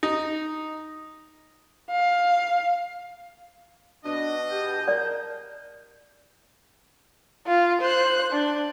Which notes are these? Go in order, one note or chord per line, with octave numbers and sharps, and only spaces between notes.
D#4
F5
B2 D4 D#5
G4 G#4 A5 G6
A#4 D5
F4
C5 F#6
D4